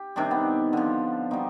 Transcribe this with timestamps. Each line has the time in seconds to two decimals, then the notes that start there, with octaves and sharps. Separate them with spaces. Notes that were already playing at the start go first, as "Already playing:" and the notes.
Already playing: G4
0.16 C3 D#3 G3 D4
0.31 B3
0.73 D3 F3
1.31 B2 G3 D#4